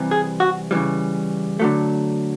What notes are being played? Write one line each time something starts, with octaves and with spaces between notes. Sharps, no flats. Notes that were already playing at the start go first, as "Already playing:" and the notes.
Already playing: C3 E3 G3
G#4
F#4
C#3 E3 G3
D3 F#3 A3